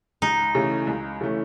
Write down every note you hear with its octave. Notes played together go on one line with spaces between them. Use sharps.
C#2 D#4
C#3 E3 A3 C#4
C#2
C#3 E3 A3 C#4